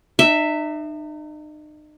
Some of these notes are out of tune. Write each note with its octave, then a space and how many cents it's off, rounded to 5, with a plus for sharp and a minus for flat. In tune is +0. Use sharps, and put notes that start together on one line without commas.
D#4 -40 E5 +0